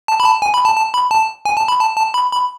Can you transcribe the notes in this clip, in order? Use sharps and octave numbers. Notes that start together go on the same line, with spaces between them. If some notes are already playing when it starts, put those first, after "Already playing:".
A5
B5
A5
G#5
B5
A5
A5
B5
A5
G#5
A5
B5
A5
A5
B5
B5